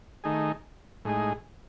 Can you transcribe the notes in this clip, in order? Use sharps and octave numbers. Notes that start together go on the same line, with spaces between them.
D#3 A3 D#4 G#4
A2 G#3 D#4 G#4